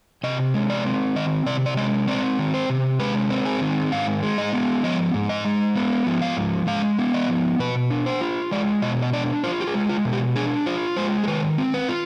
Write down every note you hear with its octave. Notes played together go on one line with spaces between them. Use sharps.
C3 D#5
G#3
D5
C4
D#3 D#5
C3 D5
D5
G#3 D#5
C4 D5
D#3
C5
C3
G#3 B4
C4
G#4
D#3
G#2 F5
G#3
D#5
B3
F3 D#5
G#2
D#5
G#3
B3
F3
F5
G#2
G#3 F5
B3
D#5
F3
B2 B4
D4
C5
F4
G#3 D5
B2 D#5
D#5
D4 D5
F4 C5
G4
G#4
G#3
F4
B2
G4
D4 G#4
F4 C5
G#3 C5
G#4
D#3 B4
C4
B4
F4